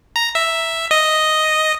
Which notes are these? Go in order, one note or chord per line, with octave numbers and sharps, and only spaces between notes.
A#5
E5
D#5